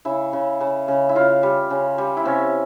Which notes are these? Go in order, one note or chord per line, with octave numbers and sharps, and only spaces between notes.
C#3 E4
C#3
C#3
C#3
E4
C#3 F4
G3
C#3
G3
E4
C3 C#4